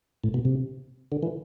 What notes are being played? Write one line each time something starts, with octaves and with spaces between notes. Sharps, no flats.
A2
B2
C3
D3
E3